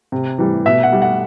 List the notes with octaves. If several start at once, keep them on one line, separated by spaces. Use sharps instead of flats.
C3
E3 G3
B2 E5
F#5
G3
F#5